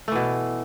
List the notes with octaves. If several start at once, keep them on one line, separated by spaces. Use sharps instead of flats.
B2 E3 A3